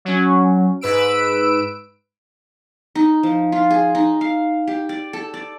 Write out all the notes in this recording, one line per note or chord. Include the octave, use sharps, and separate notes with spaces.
F#3 C#4
G#2 B4 E6 D7
D#4
F3
F4
G#4
D#4
F5
G4
D5
A4
D5